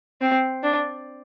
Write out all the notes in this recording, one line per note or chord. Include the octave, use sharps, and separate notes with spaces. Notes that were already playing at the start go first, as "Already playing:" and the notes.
C4
D4